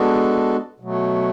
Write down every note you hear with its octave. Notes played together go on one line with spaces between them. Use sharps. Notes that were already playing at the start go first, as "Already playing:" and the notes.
Already playing: G#3 B3 D4 F#4 A4
B2 F#3 A3